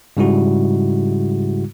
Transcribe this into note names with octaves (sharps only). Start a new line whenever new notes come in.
G#2 C#3 G3 G#3 E4 F#4